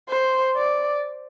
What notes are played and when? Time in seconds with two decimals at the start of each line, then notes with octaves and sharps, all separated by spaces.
0.09 C5
0.57 D5